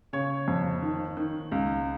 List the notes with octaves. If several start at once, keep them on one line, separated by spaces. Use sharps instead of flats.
C#3 C#5
F2
D#3
D#3
C#2